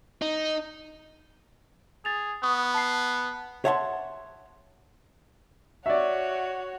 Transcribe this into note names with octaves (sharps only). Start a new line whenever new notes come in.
D#4
G#4 A6 F7
B3 C#6 D#6
A5 C7
C#5 E5 F#5 A5 B5 C6
F#4 C#5 D5 E5